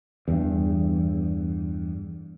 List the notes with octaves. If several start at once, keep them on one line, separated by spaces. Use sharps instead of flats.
E2 G2